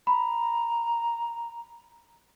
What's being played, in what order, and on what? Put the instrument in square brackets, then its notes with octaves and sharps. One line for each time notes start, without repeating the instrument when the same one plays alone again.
[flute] A#5 [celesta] B5